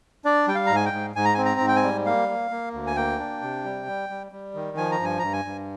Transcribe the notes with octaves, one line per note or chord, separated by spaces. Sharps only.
D4 D5
G3 G5
F5
G#2 A#5
G#5
G5
G#2
G#2 G#5
A#5
G#5
C4
A#5
G#2
G5
G#5
G3
A#3 F5
A#3
A#3
D2
G#5
A#3 G5
D4
C3
G3
G3
G3
G3
D#3
F3 G#5
A#5
G2 G#5
G2 A#5
G#5
G2